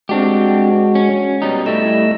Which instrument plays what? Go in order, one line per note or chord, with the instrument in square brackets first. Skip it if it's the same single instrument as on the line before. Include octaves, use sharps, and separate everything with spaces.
[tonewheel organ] G#3 F#4 [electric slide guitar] C4 D4 G4
[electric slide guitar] C#4
B2 G3 D#4
[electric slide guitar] A2 G3 [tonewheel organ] A3 D#5 E6